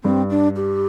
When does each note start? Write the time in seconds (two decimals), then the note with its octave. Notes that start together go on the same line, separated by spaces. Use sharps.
0.04 G2 C4
0.30 D4
0.56 G4